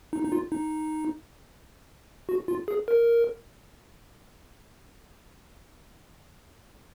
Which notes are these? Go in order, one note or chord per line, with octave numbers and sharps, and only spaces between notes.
D#4
D#4
F4
D#4
F#4
F4
G#4
A#4